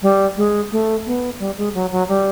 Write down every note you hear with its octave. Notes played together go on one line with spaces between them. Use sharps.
G3
G#3
A3
B3
G3
G#3
F#3
F#3
G3